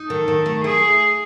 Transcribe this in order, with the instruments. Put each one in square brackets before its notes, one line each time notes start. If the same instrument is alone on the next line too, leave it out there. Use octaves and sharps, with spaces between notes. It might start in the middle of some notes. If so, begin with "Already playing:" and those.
Already playing: [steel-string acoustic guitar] D#4
[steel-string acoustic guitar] D#3 [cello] A4
[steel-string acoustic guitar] D#3
A3
[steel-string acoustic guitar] E4 [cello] G#4